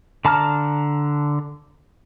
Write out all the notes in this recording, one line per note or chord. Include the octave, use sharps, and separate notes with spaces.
D3 A5 A#5 F6